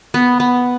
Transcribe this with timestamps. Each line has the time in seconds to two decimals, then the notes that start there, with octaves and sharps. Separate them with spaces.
0.14 B3
0.40 B3